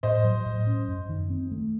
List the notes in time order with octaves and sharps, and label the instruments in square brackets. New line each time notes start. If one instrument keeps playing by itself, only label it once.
[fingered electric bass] A2 [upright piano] C5 D#5
[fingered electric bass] F#3
A2
C#4
F#2
D#3
C4
A3